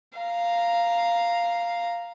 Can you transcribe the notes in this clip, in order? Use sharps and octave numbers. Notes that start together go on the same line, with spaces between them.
F5 A#5